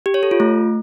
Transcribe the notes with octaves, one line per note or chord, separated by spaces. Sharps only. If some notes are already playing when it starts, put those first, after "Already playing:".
G4
C#5
A4
F4
A3